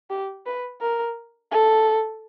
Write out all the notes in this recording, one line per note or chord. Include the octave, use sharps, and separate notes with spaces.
G4
B4
A#4
A4